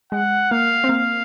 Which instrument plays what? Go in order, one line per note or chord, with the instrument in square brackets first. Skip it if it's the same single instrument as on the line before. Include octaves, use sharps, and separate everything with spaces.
[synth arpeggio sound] G#3 [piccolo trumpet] F#5
[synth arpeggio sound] A#3 [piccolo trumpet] F5
[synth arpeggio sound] C4
[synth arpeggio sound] A#3 [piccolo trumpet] F5